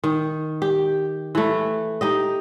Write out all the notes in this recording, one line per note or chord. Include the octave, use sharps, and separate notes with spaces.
D#3
G4
E3 A3
D#4 G4 D#5